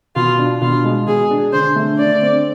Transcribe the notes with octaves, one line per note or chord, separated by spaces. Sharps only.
B2 F4
D4
B2 F4
G#3
B2 G#4
D4
D3 C5
A3
D3 D5
C4